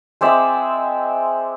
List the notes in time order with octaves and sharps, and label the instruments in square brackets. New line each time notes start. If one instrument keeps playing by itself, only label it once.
[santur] G#3 C4 D5 E5